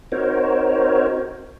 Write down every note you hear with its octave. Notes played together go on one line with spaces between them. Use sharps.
C4 D#4 F#4 A#4 C5 C#5